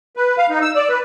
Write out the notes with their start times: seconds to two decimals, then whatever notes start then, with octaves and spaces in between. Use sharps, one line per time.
0.17 B4
0.38 F5
0.50 D#4
0.62 E6
0.75 D5
0.89 B4